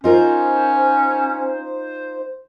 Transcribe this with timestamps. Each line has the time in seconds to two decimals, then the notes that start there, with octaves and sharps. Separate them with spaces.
0.04 C#4 D#4 F4 A#4 C5